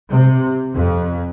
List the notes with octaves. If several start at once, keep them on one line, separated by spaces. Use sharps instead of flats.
C3
F2